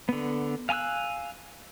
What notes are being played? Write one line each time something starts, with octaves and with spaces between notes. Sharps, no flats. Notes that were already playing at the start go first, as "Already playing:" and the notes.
D3 B3
F5 G#5 A5 E6 F#6